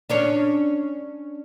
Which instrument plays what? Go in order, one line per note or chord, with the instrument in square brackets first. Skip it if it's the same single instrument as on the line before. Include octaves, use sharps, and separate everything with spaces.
[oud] C#4 D4 C#5